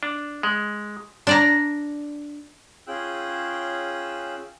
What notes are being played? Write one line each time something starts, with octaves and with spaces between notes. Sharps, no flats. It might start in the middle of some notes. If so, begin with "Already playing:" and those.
D4
G#3
D4 D5 A#5
C#4 F4 G#4 G5 E6 F#6